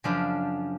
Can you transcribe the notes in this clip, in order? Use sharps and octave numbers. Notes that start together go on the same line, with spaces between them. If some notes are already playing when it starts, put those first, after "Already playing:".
F#2 C#3 F3 D4